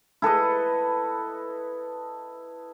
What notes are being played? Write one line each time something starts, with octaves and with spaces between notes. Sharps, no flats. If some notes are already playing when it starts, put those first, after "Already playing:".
E4 A4 B4 D#5